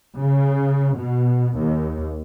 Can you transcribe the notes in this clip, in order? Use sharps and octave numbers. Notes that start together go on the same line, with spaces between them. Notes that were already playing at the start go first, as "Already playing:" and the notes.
C#3
B2
D#2